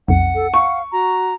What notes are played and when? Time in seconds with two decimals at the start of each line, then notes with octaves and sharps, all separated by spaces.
0.08 B1 F2 F#5
0.35 A4
0.54 F5 C#6
0.92 F#4 A#5